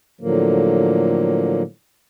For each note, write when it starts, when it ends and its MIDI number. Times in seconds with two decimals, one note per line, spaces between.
0.21 1.62 45
0.21 1.62 50
0.21 1.62 53
0.21 1.62 54
0.21 1.62 58